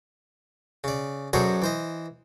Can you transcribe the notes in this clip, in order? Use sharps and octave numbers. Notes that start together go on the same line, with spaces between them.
C#3 D5
F#2 F#3 G#4 A4 C5 D5
E3 C5 D#5